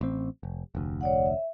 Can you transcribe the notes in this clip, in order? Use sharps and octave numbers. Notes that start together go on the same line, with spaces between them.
A1 C4
F1
F1 D2
C#5 D5 F#5
E5